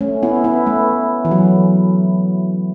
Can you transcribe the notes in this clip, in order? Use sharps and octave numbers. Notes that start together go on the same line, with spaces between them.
A3 C#4
B3 E4
B3 E4
A3
E3
F#3